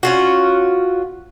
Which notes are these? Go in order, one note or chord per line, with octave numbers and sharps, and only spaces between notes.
C#4 F4 F#4